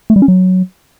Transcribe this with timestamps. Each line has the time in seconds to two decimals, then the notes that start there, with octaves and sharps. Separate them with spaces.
0.10 A3
0.16 G3
0.22 C#4
0.28 F#3